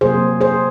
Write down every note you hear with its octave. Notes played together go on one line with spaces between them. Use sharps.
C3 F#3 A#3 G#4 C5
G#4 C5